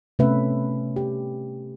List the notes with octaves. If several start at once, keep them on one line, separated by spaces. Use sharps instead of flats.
C3 A3 B3 C#4 B4 E5
G4